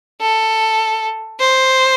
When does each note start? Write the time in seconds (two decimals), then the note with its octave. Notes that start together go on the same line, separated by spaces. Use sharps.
0.22 A4
1.40 C5